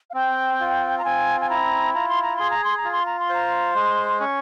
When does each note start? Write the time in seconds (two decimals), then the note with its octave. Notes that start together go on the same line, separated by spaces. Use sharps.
0.10 F5
0.14 C4 G5
0.60 F4
0.99 A#5
1.05 C4 G#5
1.41 G#5
1.49 E4 A#5
1.94 F4 A#5
2.09 C6
2.23 A#5
2.36 G#4 C6
2.51 A#5
2.64 C6
2.77 A#5
2.85 F4
2.92 C6
3.06 A#5
3.20 C6
3.29 C5 A#5
3.75 G#3 C6
4.09 C6
4.20 C#4 C#6